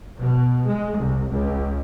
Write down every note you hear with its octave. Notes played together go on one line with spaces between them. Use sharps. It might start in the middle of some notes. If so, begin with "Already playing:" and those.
B2
G#3
C2
C#2